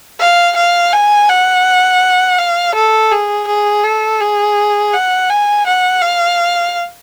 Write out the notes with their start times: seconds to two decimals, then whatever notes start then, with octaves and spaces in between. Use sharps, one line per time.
0.20 F5
0.56 F5
0.93 G#5
1.29 F#5
2.39 F5
2.75 A4
3.12 G#4
3.47 G#4
3.84 A4
4.20 G#4
4.93 F#5
5.30 G#5
5.66 F#5
6.02 F5